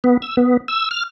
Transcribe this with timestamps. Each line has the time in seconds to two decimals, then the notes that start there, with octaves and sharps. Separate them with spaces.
0.04 B3
0.22 E6
0.37 B3
0.68 E6
0.91 F6